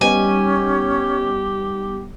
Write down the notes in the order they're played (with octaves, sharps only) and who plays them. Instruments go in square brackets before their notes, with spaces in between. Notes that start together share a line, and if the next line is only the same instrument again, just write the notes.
[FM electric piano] G3 B3 D#4 [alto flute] C#4 [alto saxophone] G4 [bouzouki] G#5